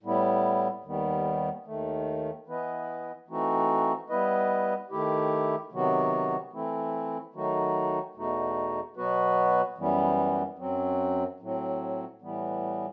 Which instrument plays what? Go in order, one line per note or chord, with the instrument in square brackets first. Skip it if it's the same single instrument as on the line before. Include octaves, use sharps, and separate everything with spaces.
[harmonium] A2 G3 B3 E4
D#2 D#3 G3 B3
D#2 D#3 A3
E3 B3 E4 B4 D#5
E3 A3 C4 D#4 F#4
G3 B3 E4 B4 D#5
D#3 A3 E4 G4
C3 D#3 F#3 B3 F#4
E3 A3 C4 E4
D#3 F#3 A3 D#4 F#4
E2 B2 A3 D#4 F#4
B2 F#3 B3 F#4 B4
F#2 E3 G3 B3
F#2 F#3 C4
A2 F#3 C4
A2 E3 G3 B3